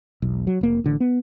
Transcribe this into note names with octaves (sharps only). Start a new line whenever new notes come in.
E1 B1
F#3
F1 A#3
A1 D3
B3